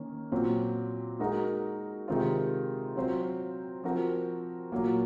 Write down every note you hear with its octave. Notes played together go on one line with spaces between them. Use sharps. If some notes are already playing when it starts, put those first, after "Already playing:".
Already playing: D#3 A#3 C#4
A#2 F#3 C4
G#3 D#4 F#4 A#4
C3 D#3 G#3 C4 F4
F#3 C4 F4 C5
F3 C4 F#4 A#4
A#2 F#3 A#3